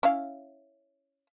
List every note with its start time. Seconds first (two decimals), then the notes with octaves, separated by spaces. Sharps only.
0.03 C#4 E4 F5